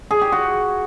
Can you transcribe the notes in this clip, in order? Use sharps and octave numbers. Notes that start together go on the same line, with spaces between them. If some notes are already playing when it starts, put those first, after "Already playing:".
G#4
G4
F#4